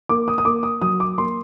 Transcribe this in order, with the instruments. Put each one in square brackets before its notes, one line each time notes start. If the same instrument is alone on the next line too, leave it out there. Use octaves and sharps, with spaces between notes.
[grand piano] A#3 D6
D#6
D#6
A#3 D6
D#6
F#3 D#6
D6
A#3 C6